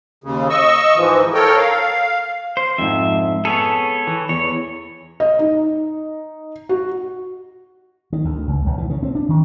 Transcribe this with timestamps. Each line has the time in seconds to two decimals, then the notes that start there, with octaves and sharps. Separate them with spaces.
0.24 D#2 C#3
0.50 D#5 C#6 E6
0.96 G#2 E3 F3
1.34 A4 A#4 C#5 G5
1.57 F5
2.57 C5
2.78 F2 G#2 E5
3.45 B3 G#4 A4 C#5
4.07 E3
4.29 E2 C#5
5.20 D#5
5.39 D#4
6.69 F#4
8.13 D#3
8.25 D2
8.48 C#2
8.66 B1
8.78 E3
8.90 C#3
9.03 C4
9.15 D4
9.29 D#3